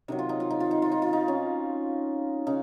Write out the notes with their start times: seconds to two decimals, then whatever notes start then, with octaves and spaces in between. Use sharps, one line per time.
0.08 C3 D#3 F#3 D#4
0.19 F4
0.29 D#4
0.40 F4
0.50 D#4
0.60 F4
0.71 D#4
0.82 F4
0.92 D#4
1.02 F4
1.13 D#4
1.28 C#4
2.47 C#3 D#4